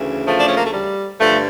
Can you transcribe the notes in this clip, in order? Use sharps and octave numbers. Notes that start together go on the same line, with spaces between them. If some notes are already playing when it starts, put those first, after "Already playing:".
Already playing: D2 C#3 E3
F3 A3
D4
C#4
A#3
A3
G3
G2 D3 F3 A3